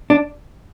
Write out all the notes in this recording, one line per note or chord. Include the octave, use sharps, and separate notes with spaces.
D4